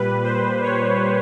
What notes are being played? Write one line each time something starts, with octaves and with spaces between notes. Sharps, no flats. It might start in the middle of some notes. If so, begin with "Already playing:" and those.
Already playing: A#2 G3 B4
C5
C#5